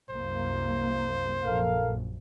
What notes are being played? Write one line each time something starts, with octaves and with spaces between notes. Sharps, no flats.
C2 F#2 A#3 C5
A#1 F#2 A4 A#4 F5